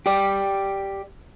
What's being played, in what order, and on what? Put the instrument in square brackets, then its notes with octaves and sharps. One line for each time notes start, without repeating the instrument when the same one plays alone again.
[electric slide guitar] G4 D5